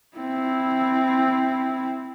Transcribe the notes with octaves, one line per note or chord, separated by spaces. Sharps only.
C4 E4